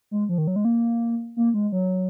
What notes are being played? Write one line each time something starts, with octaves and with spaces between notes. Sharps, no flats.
G#3
F3
D#3
F#3
G#3
A#3
A#3
G#3
F#3